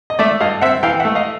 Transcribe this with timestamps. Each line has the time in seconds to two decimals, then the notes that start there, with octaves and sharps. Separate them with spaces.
0.10 D#5
0.19 A3 D5 E5
0.40 G2 D#5 F5
0.61 C4 E5 F#5
0.83 E3 F5 G5
1.00 E5 F#5
1.05 A3
1.15 D#5 F5